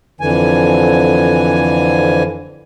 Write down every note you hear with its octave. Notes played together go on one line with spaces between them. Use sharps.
F2 D3 E3 G#5